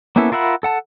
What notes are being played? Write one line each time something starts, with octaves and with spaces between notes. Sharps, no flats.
A#3 B3 C#4 E4 A4
F4 A#4 E5 F#5 B5
A4 F#5 A5